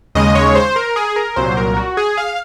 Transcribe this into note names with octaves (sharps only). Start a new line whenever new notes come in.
D#2 C#3 G#3 D#5
C#5
C5
A#4
G#4
A#4
C2 A#2 F#3 C5
A#4
F#4
G#4
F5